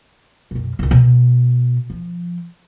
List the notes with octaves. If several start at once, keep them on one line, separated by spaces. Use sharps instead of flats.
B1 F#2
C#2 D#3
B2
F3